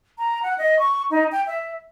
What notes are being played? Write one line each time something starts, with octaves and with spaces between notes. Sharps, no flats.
A#5
F#5
D#5
C#6
D#4
G5
E5